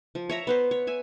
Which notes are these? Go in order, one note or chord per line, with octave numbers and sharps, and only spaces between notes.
F3
C#5 E5 A#5
B3 B4 C5
C#5
E5 G#5